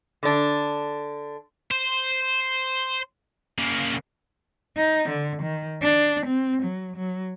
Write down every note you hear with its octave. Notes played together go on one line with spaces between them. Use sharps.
D3 D4
C5
C#3 A#3
D#4
D3
D#3
D4
C4
F#3
F#3